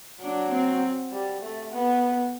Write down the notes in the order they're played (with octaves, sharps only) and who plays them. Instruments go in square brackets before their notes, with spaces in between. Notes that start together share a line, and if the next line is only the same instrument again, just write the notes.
[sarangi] F#3 [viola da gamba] D4
[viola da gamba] C4
[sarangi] G3
A3
B3